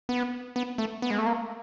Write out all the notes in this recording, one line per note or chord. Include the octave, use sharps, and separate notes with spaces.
B3
B3
A3
B3
G#3
A3
A#3